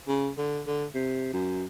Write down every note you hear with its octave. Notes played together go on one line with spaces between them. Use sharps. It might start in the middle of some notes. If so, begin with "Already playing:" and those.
C#3
D3
D3
C3
F#2